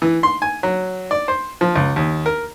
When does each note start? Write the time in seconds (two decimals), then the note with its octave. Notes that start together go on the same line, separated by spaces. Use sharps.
0.02 E3
0.23 C6
0.42 G#5
0.63 F#3
1.11 D5
1.28 C5
1.61 F3
1.76 C#2
1.96 D#2
2.26 A#4